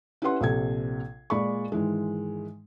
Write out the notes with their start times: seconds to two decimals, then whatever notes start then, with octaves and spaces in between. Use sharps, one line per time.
0.22 C#4 E4 G4 B4 F#5 C6
0.41 A#1 C3 A4 G#6
1.30 A#2 G#3 D5 B5 C#6
1.72 G#2 D#3 E3 G#3